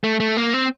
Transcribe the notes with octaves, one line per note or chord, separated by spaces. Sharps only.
A3
A3
A#3
C4